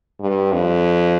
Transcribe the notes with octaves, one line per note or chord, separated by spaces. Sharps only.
G2
F2